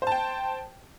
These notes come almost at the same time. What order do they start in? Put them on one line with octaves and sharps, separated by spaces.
C5 A5 G5